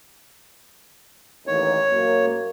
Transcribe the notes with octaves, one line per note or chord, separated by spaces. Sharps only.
A1 D#2 C#5
F#2 A#3